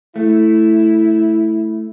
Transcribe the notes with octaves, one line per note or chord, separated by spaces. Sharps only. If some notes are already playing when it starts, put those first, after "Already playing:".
A3 E4